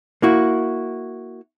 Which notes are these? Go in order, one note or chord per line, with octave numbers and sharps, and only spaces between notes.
A#3 E4 F#4